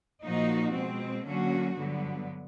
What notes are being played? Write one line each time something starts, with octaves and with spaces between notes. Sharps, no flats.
A#2 F3 A#3 D#4 F#4
B2 G#3 C4
D3 F#3 A#3 C#4 F#4
G2 D3 F#3 B3